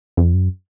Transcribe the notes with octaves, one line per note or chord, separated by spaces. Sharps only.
F2
F#2